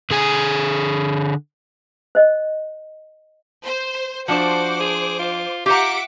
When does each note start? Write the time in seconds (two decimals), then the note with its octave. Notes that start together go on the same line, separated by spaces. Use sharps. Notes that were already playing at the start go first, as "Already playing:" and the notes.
0.11 D3 G#4 G#5
2.15 C5 D#5
3.64 C5
4.28 F3 D4 F#4 C5 A5 D6
4.80 G#4
5.19 F4
5.66 F4 G4 E5 F#5 A#5 D6